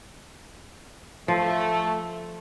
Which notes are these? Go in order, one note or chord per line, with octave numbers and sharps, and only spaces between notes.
F3 A3